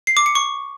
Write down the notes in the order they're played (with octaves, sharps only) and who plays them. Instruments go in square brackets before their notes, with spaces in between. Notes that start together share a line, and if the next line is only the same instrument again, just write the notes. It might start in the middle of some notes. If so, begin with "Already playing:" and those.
[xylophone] C7
D6
C#7
C#6